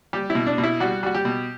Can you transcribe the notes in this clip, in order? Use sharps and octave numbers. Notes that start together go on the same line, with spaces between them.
G3 G4
E4
B2
D4
B2
E4
G3 F#4
G3 F#4
G4
B2